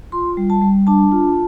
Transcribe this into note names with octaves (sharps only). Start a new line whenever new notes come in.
F4 C6
G3
A5
G3
D4 A5
F4